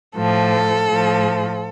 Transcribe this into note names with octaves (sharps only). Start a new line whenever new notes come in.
A2 F3 A4
A2 F3